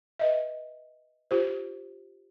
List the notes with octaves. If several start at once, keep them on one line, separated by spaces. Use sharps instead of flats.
B4 D#5 E5
F4 G4 C5